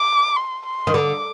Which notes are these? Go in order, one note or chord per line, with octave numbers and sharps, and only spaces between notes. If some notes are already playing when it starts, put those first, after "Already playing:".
Already playing: D6
C6
C6
D#3
D3 D6